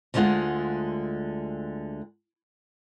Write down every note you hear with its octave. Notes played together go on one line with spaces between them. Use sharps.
D2 D3 G3 G#3 F4 F#5